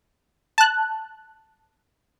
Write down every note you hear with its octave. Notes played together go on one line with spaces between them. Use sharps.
A5 F#6